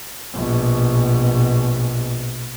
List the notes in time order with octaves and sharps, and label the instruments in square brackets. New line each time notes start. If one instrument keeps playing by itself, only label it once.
[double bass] A#1 B2